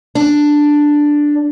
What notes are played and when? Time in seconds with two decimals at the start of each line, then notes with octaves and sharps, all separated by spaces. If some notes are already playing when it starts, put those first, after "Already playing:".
0.15 D4